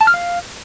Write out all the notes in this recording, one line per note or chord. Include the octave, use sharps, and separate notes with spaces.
A5
F6
F5